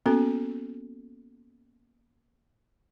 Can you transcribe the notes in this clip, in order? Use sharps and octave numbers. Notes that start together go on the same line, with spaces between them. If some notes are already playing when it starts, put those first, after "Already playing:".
A#3 B3 C#4 F#4 A4